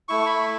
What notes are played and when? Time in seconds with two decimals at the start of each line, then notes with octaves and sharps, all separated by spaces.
0.09 A3 E4 C#6
0.26 B5